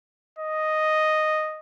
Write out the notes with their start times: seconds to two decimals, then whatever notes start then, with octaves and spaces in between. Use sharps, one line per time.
0.38 D#5